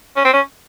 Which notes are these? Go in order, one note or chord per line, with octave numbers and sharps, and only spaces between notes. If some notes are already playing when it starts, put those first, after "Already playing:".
C#4
C4
C#4